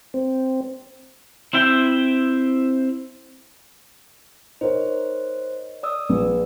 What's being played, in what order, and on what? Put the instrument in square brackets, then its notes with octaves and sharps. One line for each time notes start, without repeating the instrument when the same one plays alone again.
[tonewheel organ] C4
[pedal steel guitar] C4 E4 E5 G5
[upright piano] D#4 A#4 C#5 [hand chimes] C5
[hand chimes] D5 D#6 E6
[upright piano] A#1 [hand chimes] B4